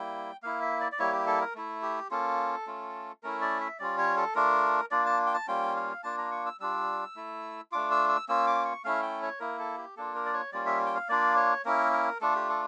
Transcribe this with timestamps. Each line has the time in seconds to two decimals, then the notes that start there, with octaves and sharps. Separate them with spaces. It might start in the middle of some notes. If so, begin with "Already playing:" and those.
Already playing: G3 A#3 E4 G5
0.43 A#3 E4 F5
0.62 E5
0.81 D5
0.92 D5
0.99 G3 A#3 E4 C#5
1.13 G4
1.27 A4
1.41 A#4
1.55 A3 E4
1.82 G4
2.11 A#3 C#4 F4 A4
2.67 A3 C#4 F4
3.23 A3 C#4 E4 A#4
3.41 D5
3.61 E5
3.79 G3 C#4 F4 D5
3.98 C#5
4.17 A4
4.35 A3 D4 F4 A#4
4.91 A#3 D4 F4 D5
5.06 A5
5.26 G5
5.34 A5
5.47 G3 A#3 C#4 F4 G5
5.76 F5
6.03 A#3 D4 F4 A5
6.18 A#5
6.31 C#6
6.46 E6
6.60 G3 D4 F4 E6
7.16 A3 E4
7.72 A3 D4 F4 D6
7.91 E6
8.09 E6
8.29 A#3 C#4 F4 E6
8.47 D6
8.65 C#6
8.84 A3 C#4 E4 F5
9.02 G5
9.22 C#5
9.40 A#3 E4 A#4
9.59 A4
9.78 G4
9.97 A#3 D4 F4 A4
10.15 A#4
10.26 D5
10.34 C#5
10.52 G3 A#3 C#4 F4 D5
10.66 E5
10.86 G5
10.95 F5
11.09 A#3 D4 F4 D5
11.37 C#5
11.65 A#3 C#4 E4 A#4
11.93 A#4
12.21 A3 D4 F4 A4
12.35 G4
12.49 A4